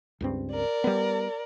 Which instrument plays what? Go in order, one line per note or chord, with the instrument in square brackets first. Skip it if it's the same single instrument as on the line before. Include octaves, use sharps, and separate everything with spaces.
[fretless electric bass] C#2 G2 C4
[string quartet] A#4 D5
[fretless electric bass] G3 B3